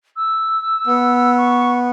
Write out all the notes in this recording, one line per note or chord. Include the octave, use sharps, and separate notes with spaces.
E6
B3
C#6